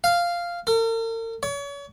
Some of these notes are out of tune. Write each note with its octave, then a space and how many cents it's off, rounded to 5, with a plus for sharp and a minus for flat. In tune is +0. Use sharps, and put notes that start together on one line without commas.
F5 -5
A#4 -45
C#5 +35